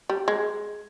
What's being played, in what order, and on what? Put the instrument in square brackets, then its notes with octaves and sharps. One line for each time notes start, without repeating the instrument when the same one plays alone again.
[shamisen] G3
G#3